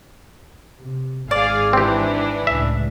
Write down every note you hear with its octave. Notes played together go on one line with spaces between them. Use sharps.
C3
G#1 G#4 D5 F5
E3 C4 D4 G4
C#2 A2 E5